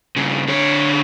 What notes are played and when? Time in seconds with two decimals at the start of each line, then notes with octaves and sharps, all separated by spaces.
0.16 G2 C#3
0.48 D3 C#5